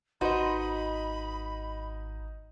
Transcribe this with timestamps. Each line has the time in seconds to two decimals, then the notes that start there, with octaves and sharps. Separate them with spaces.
0.21 G#1 D#4 F#4 B4 C5 D#5 B5